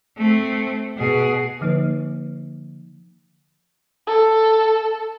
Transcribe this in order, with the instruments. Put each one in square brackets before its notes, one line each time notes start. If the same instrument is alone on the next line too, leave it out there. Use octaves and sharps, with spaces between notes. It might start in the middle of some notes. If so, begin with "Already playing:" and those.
[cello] A3 C4
B2 G#4
[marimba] D3 F3 A#3 D#4 B4
[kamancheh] A4